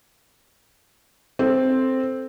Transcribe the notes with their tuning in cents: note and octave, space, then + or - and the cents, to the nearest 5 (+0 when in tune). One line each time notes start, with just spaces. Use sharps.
C4 +0 A4 +0